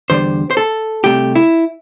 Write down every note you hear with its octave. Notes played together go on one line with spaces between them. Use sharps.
E2 D3 G3 C5
C5
A4
C2 C3 A3 G4
E4